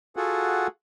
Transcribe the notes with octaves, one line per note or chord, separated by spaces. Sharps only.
F4 F#4 G#4 A4 F#5